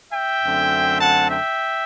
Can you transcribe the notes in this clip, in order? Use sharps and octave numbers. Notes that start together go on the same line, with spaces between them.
E5 G5
F#2 D3 A3 C4
F#5 A5
E5 G5